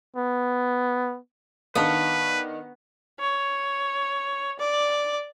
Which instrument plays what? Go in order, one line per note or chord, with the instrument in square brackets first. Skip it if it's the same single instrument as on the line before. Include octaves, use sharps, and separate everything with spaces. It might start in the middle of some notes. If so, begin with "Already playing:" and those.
[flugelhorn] B3
[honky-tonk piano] D#3 D4 D#4 [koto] B3 [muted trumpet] B4 [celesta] F5 A5
[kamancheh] C#5
D5